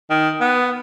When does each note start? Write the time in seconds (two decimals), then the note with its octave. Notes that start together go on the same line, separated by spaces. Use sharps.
0.10 D#3
0.40 B3